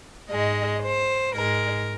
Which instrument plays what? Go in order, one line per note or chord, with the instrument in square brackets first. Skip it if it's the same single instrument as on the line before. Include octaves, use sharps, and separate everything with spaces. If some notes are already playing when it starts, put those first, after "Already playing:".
[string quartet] G#2 G#3 D#5
C5
G#2 G#3 A#4